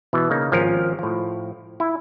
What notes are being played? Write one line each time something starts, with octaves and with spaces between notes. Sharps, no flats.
B2 E3
C#3 A#3 D#4
G#1 F3 C#4 A#4
A2 F3
E4